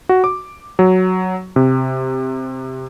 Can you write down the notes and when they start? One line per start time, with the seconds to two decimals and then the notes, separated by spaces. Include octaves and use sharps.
0.09 F#4
0.24 D6
0.79 F#3
1.56 C3